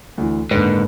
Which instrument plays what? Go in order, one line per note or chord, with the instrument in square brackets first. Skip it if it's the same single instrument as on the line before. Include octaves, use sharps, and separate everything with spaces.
[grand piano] D2 E3
[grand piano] F#1 D3 B4 [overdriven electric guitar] G#2